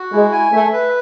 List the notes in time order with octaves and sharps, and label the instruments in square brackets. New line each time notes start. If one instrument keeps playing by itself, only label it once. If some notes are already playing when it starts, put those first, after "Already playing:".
Already playing: [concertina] F#4
[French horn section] G#3 [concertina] E4
[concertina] G#5
[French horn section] A3 [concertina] E5
[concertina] B4